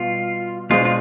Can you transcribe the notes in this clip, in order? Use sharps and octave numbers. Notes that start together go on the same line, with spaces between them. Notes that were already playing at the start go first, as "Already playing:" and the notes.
Already playing: B2 G3 B3 F4
B2 G#3 D4 F4 G#4 C5
F4